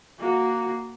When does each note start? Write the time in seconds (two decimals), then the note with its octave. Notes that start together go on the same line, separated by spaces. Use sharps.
0.19 A#3 F#4